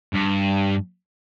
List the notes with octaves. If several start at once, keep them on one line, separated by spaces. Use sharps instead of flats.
G2